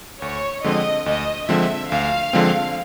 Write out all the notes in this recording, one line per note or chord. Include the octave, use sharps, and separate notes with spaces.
D2 C#5
D3 F3 G#3 C4 D#5
D2 D#5
D3 F3 G#3 C4 E5
D2 F5
D3 F3 G#3 C4